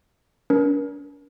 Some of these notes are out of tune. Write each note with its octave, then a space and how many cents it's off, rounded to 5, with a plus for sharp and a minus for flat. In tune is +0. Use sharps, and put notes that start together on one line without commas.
D4 -45 A#4 +35